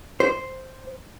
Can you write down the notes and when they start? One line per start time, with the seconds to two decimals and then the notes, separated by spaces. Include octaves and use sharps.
0.20 C5